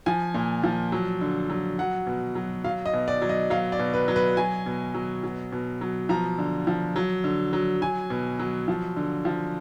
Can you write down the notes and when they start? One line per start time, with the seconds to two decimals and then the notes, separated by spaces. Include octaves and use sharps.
0.06 F3 G#5
0.34 A#2
0.64 F3
0.92 F#3
1.21 D3
1.49 F#3
1.79 F#3 F#5
2.07 B2
2.35 F#3
2.64 F#3 F5
2.86 D#5
2.93 B2
3.08 D5
3.22 F#3
3.29 D#5
3.50 F#3 F5
3.72 D5
3.79 B2
3.94 B4
4.08 F#3
4.16 B4
4.37 F#3 G#5
4.66 B2
4.94 F#3
5.24 F#3
5.52 B2
5.81 F#3
6.09 F3 A#5
6.39 D3
6.67 F3
6.96 F#3
7.24 D3
7.53 F#3
7.82 F#3 G#5
8.10 B2
8.39 F#3
8.68 F3
8.97 D3
9.25 F3